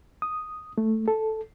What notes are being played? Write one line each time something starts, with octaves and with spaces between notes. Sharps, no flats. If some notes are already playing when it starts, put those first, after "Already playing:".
D#6
A3
A4